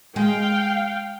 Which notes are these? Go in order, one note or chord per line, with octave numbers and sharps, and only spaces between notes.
G#3 F5 G5